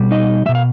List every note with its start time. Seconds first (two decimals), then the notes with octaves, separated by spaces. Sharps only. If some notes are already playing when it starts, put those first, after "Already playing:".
Already playing: B2 G3
0.11 D#4 D#5
0.46 B2 G3 E5
0.55 F5